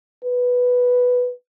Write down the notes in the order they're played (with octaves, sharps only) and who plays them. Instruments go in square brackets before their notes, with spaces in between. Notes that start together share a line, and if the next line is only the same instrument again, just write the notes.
[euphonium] B4